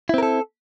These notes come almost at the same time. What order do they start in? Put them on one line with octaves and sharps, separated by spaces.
E4 C4 A#4 A4